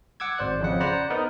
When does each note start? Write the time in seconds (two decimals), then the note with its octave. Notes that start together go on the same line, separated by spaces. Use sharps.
0.20 F#5 D6 E6 G#6
0.38 G#1 C5 D5 F#6
0.60 F2 C#3 F#5
0.80 C5 D5 F#5 A#5 B5
1.10 B3 D#4 A#4 B4